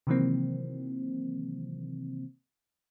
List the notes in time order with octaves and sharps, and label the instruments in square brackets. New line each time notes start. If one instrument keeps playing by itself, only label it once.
[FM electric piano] C3 D#3 E3 F#3 A#3 C4